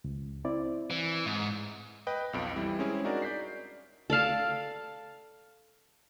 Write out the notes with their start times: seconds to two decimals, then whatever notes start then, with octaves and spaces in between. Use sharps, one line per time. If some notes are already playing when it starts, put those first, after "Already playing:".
0.04 C#2
0.45 C4 E4 D5
0.90 E3
1.26 G#2
2.07 B4 D#5 G5
2.33 B1 F2 D7
2.55 E3 G3 E4
2.79 G#3 C4 C#4 E4 G#4
3.04 D4 D#4 F#4 G#4 A#4 D5
3.22 D5 G6 B6 C7
4.10 A4 D5 F5 A5